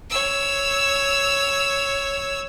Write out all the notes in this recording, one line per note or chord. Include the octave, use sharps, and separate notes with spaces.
C#5 E6